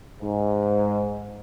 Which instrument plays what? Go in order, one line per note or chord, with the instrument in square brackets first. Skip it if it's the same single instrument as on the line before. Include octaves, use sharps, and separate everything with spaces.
[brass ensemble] G#2